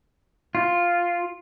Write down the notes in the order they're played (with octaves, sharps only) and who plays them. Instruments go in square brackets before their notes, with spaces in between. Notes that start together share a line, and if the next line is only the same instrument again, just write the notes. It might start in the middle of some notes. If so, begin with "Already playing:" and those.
[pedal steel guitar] F4